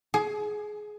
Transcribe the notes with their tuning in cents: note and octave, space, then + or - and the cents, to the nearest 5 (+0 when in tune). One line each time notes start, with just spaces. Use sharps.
G#4 +20